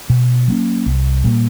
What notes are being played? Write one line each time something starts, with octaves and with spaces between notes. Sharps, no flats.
B2
F#3 A#3 C#4
C2
A#2 G3 A#3